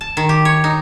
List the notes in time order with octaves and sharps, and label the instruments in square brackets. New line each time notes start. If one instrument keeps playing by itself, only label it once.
[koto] A5
D#3
G4
C#5
D#4